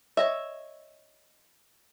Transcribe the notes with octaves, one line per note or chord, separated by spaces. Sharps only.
C#5 D#5 E5